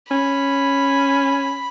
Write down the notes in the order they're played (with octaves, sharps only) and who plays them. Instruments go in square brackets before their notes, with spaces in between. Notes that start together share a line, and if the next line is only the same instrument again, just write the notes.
[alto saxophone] C#4 [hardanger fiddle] B5